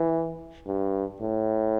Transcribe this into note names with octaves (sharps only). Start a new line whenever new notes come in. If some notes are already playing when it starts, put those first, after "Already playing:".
Already playing: E3
G2
A2